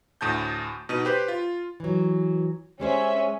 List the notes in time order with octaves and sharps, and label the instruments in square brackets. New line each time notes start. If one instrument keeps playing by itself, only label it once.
[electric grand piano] D2 A2 A5 G6
B2 D#4 D#7
G4 B4 C5
F4
[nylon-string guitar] E3 F#3
[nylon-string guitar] G3 G#3 C5 [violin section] C#4 E5